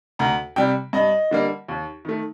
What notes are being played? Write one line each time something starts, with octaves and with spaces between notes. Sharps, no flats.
D2 A#5
C3 G3 G5
G2 D#5
D3 G3 A#3
D#2
D#3 A3